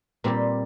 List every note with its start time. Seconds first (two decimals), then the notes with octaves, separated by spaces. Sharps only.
0.24 A#2 G3 C4 G4